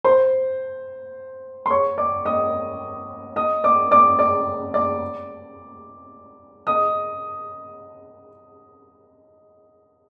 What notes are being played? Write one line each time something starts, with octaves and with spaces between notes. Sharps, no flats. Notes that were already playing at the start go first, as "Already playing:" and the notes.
C5 C6
C6
C#5 C#6
D5 D6
D#5 D#6
D#5 D#6
D5 D6
D5 D6
D5 D6
D5 D6
D#5 D#6